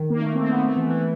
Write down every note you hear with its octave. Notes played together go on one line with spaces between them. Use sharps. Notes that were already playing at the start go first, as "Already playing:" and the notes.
Already playing: D#3
A#3
A3
C4
A#3
B3
A3
E3
E3